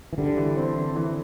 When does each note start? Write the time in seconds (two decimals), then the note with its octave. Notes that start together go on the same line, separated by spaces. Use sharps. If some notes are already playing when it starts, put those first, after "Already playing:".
0.13 E3
0.18 D3 G3
0.37 E3
0.57 C4
0.76 E3
0.96 E3